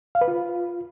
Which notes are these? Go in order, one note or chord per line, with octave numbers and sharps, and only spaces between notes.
F5
B4
F4